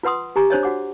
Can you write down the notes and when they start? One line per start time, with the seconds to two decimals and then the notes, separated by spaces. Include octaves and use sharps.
0.03 F4 B4 F#5 C6 D#6
0.36 G4 G#5 A#5 C#6
0.50 D4 C5 C#5 D#5
0.63 F#4 F#5 D6